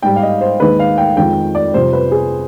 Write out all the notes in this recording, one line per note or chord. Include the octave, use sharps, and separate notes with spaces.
G#2 G3 G5
F5
D#5
C5
D#2 D#3 G#3 B4
F5
G5
F2 D#3 G#3 G5
D5
F2 C3 G3 C5
B4
G#4